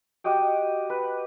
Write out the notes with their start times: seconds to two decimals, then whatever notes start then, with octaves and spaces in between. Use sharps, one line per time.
0.24 F#4 G4 D#5 G5
0.90 B4